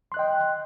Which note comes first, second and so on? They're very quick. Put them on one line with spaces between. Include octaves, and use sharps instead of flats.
C6 F#6 D#5 G5